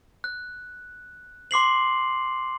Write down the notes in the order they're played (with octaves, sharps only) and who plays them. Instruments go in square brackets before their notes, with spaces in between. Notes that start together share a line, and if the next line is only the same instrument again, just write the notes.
[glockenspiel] F#6
C6 D6 C7 F#7